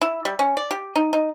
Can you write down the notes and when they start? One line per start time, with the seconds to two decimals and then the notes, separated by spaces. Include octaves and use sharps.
0.01 E4
0.25 G3
0.39 C#4
0.57 D5
0.71 G4
0.96 D#4
1.13 D#4